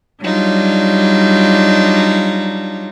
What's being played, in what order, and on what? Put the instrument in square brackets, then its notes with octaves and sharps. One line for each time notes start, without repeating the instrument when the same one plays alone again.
[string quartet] F#3 G3 D4 D#4 F4